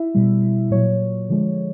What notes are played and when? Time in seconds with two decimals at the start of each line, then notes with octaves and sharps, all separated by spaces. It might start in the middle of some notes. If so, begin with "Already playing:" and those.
Already playing: E4 E5
0.14 B2 G3
0.71 A#2 F#3 C#5
1.29 D3 F3 G#3